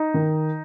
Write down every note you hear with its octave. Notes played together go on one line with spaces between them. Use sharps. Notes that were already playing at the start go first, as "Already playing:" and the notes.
Already playing: D#4
D#3